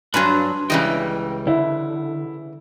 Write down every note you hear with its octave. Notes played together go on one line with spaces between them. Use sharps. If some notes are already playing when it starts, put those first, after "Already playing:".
G2 F#3 D4 F4 B4 G#5
C#2 C#3 E3 G3 D#5 G5
D3 E4